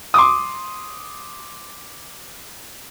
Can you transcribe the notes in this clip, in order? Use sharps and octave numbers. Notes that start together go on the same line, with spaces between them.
C6 D6 D#6